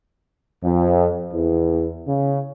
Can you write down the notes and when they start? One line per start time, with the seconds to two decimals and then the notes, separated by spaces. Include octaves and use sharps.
0.62 F2
1.33 E2
2.07 C#3